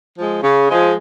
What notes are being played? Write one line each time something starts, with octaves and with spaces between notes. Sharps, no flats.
F3 G#3
C#3
F3 G#3